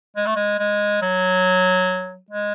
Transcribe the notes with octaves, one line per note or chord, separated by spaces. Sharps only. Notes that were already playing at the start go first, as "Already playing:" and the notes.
G#3
A3
G#3
G#3
F#3
G#3